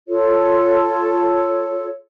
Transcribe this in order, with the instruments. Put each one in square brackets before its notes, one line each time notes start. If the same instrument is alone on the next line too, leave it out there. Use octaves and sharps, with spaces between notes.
[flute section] F4 A4 C#5